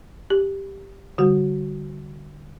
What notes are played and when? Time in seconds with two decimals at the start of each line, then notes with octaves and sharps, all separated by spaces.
0.30 G4
1.18 D3 G3 F#4